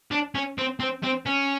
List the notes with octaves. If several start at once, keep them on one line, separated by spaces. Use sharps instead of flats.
D4
C#4
C4
C4
C4
C#4